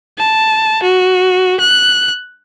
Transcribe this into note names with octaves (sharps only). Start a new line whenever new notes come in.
A5
F#4
F#6